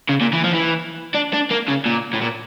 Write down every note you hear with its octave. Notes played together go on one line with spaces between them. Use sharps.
C#3
A#2
E3
F3
E3
D4
D4
A#3
C#3
A#2
A2
A#2